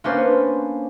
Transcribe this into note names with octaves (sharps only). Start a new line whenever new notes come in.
A#3 B3 C#4 D4 B4 C5